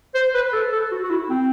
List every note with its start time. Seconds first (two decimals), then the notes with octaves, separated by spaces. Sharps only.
0.15 C5
0.35 B4
0.53 A4
0.72 A4
0.91 F#4
1.03 F#4
1.10 E4
1.30 C4